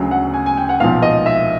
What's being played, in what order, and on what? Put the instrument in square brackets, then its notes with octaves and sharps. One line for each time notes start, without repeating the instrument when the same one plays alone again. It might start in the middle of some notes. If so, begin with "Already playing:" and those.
Already playing: [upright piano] D2 C#3 F#3
F#5
G#5
G#5
G5
F#5
B1 A#2 F3 F5
D#5
E5